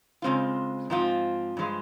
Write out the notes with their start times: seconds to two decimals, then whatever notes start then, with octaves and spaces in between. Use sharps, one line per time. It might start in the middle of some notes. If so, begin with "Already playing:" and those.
0.22 C#3 G#3 C4 F4
0.90 G#2 F3 C4 F4
1.57 G2 F3 G#3